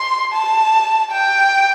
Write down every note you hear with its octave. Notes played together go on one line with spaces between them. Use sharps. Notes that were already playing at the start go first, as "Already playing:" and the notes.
Already playing: C6
A5
G5